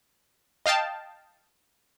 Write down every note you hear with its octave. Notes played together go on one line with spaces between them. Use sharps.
D#5 F5 G5 A5